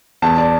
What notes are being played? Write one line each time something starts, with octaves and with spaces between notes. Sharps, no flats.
E2 A5
D5